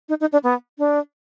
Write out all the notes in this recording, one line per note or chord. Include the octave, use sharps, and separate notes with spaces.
D#4
D#4
D4
B3
D4